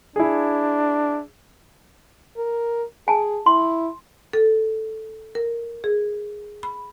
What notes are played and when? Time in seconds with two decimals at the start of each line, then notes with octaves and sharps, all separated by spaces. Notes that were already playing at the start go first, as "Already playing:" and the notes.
0.16 D4 E4 G#4
2.37 A#4
3.08 G#4 G#5 A5
3.46 E4 C6
4.33 A4
5.35 A#4
5.84 G#4
6.63 B5